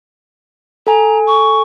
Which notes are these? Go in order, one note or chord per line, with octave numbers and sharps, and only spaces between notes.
A4 G#5 A#5
C#6